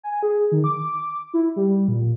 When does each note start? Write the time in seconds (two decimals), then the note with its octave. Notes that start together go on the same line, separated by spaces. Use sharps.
0.03 G#5
0.23 G#4
0.52 D#3
0.64 D6
1.34 E4
1.56 G3
1.88 A#2